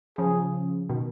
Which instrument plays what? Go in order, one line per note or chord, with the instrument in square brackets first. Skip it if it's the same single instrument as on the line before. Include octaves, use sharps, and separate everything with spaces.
[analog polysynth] C#3 F3 [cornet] G#4
[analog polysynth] B2 D#3